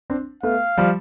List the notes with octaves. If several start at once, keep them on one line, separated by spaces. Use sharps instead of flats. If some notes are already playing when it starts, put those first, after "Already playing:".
C4 D4
A3 B3 F5
F3 G3